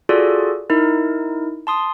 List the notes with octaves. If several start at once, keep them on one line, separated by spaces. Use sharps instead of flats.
F4 F#4 G#4 A4 D5
D#4 E4 A#4
A5 C6 D#6